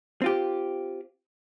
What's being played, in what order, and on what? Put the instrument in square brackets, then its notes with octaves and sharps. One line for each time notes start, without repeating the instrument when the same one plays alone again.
[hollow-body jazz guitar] C4 F4 G4